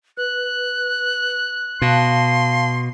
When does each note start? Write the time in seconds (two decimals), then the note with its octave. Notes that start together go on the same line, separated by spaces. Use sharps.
0.17 B4 F#6
1.82 B2 F5 A5 C6